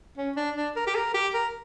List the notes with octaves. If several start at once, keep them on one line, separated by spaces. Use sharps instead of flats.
C#4
D4
D4
A#4
G4
A#4
G4
A#4